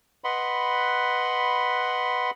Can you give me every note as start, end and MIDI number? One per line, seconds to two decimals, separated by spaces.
0.24 2.31 71
0.24 2.31 75
0.24 2.31 78
0.24 2.31 83
0.24 2.31 84